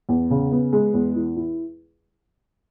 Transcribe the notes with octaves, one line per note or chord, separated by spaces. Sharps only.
E2
C#3
B3
G#3
E2
E3
E4